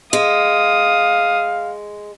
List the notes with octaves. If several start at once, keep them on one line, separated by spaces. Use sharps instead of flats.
G#3 F5 D#6